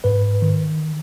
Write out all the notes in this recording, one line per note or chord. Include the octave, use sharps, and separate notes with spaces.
G#2 B4
D#3